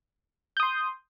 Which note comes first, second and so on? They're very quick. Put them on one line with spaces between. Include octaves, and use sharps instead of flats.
G6 D#6 C6